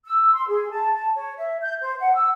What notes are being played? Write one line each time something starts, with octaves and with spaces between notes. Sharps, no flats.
E6
C6
G#4
A5
A5
C#5
E5
G6
C5
F#5
E6